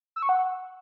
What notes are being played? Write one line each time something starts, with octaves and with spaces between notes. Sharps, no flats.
E6
C#6
F#5